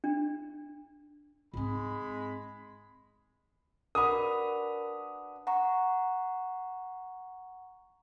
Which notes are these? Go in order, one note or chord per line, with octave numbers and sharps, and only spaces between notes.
D4
G#2 G#3 C4 B5
D4 F#4 A#4 B4 B5 D#6
F#5 A#5 C#6